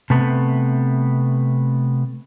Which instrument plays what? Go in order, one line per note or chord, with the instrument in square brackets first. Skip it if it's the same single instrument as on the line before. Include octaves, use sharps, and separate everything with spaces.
[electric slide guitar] C3 A3 B3